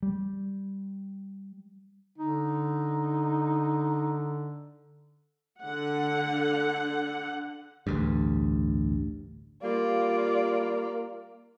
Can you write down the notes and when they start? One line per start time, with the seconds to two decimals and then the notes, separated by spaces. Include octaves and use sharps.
0.03 G3
2.18 D3 D#4
5.62 D3 F#5
7.87 A1 D2 G2
9.64 G3 A#3 F4 D5